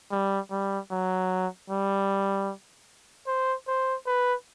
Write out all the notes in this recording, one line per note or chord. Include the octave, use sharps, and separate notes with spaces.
G3
G3
F#3
G3
C5
C5
B4